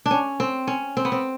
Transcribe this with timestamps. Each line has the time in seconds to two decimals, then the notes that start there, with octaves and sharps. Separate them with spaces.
0.06 D4
0.11 C#4
0.40 C4
0.67 C#4
0.97 C4
1.05 B3
1.12 C4